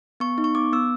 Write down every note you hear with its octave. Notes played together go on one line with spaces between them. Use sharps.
B3 C#6
D#4
C#6
B3 D6
B3 E6